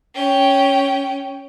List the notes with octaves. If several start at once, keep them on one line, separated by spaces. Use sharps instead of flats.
C#4 G5